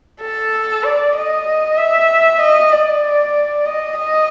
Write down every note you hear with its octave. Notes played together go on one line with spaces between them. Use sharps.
A4
D5
D#5
E5
D#5
D5
D#5
D#5